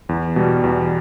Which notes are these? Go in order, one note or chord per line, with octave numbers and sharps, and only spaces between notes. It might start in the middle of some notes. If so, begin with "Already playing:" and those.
E2
B2 G3
E2